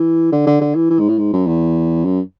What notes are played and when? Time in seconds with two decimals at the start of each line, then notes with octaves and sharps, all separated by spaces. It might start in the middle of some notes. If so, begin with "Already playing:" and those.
Already playing: E3
0.32 D3
0.47 D3
0.61 D3
0.75 E3
0.90 E3
0.99 G#2
1.09 A2
1.18 G#2
1.33 F#2
1.47 E2
2.05 F#2